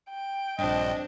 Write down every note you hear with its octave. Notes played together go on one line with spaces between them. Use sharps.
G5
A#1 G2 C4 D4 D#5